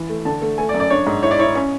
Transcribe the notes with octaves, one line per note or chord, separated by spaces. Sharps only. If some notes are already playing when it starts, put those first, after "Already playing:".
Already playing: E3
A3
D3 A5
A3
A3 G#5
D5
F#2
D5
D4 C#5
G#2
E4 C#5
D5
E4 C#5
C#4